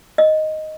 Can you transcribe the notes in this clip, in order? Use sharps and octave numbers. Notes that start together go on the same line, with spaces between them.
D#5